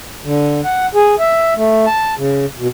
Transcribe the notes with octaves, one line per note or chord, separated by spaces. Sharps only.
D3
F#5
G#4
E5
A3
A5
C#3
B2